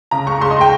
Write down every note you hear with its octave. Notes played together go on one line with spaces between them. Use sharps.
C#3 A#5
C#2 C#6
C#2 C6
D#5
G5